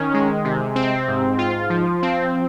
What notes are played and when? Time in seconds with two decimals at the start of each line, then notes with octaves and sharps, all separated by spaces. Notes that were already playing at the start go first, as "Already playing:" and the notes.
Already playing: D#3 C#4
0.14 G#3
0.45 C3
0.76 C4
1.08 G#2
1.38 F4
1.70 F3
2.02 C4